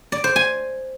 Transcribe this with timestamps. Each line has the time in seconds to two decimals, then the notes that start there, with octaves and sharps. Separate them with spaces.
0.12 D5
0.24 C5
0.36 G#5